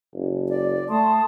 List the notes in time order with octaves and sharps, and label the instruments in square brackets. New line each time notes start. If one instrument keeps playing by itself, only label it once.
[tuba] F#1
[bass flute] D5
[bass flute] A3 [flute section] A5 C6 D#6